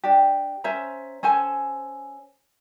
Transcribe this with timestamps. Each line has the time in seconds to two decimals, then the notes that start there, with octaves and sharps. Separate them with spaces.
0.04 D4 G4
0.64 C#4 C5 E5 A#5
1.23 C#4 A4 C5 G#5